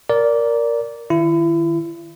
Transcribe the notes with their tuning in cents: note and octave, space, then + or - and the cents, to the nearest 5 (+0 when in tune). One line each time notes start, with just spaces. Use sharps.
A#4 +0 D5 -15
D#3 +0 E4 +30